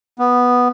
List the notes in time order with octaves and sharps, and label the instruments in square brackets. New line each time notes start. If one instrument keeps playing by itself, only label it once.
[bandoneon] B3